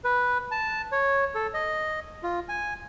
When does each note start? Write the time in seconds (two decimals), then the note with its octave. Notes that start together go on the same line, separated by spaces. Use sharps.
0.04 B4
0.51 A5
0.92 C#5
1.35 A4
1.54 D#5
2.23 F4
2.49 G#5